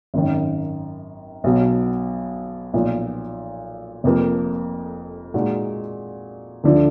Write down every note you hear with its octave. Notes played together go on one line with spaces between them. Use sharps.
G#1 F#2 D#3
B1 B2 F#3
B1 A#2 F3
F1 F2 F3 A#3
A#2 G#3 D#4 F#4
D2 D3 F3